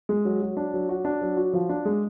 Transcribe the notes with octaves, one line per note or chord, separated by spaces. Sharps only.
G#3
F#3
F#3
D4
F#3
F#4
D4
F#3
F#4
F3
D4
G#3